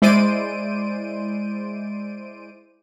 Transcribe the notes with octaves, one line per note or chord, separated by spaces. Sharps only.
G#3 E4 C5 D5 D7 D#7